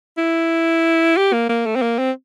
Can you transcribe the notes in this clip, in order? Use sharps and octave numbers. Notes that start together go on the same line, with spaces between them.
E4
G4
A#3
A#3
A3
C4
A#3
C4